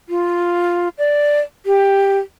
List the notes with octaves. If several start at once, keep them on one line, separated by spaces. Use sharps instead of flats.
F4
D5
G4